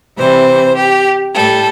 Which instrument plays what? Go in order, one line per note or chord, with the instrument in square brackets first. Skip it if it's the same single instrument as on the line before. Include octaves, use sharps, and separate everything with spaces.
[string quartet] C3 E3 G3 C5
G4
A2 G3 A4